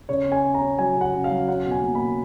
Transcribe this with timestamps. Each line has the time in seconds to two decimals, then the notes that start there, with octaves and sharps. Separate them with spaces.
0.09 C#3 C#5
0.26 C#4
0.32 G#5
0.43 C#4
0.54 A#5
0.61 C#4
0.79 F#3 G#5
0.96 C#3
1.01 F#5
1.13 C#3
1.24 F5
1.31 F#3
1.48 C#4 F#5
1.66 B2
1.71 G#5
1.83 A#3
1.95 B2 B5